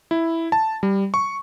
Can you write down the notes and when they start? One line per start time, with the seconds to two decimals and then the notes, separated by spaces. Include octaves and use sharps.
0.11 E4
0.52 A5
0.83 G3
1.14 C#6